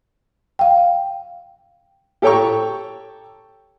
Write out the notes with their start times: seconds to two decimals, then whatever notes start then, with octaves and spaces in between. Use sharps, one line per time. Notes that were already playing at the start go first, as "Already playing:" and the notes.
0.59 F5 G5
2.22 G4 A4 C#5 G5 A#5 C#6